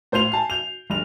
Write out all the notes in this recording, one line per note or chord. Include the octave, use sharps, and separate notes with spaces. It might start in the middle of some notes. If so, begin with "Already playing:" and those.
A2 C5 C6 G6 C7 F7
G#5 A5 C7
G6 F7
G1 F7